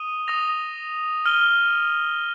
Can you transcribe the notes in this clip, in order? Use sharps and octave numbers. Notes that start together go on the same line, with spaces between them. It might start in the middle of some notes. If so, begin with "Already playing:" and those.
Already playing: D#6 D#7 G7
D#6 A#6 F7
F6 D#7 G7